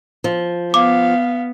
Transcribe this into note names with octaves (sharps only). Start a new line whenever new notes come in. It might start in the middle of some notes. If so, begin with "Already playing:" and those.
F3
B3 F5 D6